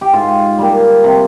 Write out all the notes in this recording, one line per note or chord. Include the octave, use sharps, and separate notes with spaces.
G4
G#2 F4
G3 A#3
C3